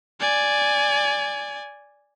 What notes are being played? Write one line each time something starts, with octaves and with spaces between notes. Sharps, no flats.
D5 G#5